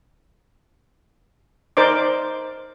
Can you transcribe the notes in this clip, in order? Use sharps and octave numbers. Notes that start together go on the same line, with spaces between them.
D#4 A#4 C5 D5 D6